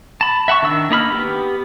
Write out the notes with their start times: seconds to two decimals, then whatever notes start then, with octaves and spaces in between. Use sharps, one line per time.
0.21 A5 B5
0.48 E5 F#5 A5 C#6
0.62 D#3 D4 E6
0.90 A#3 D#4 B5 F6
1.12 B3 G4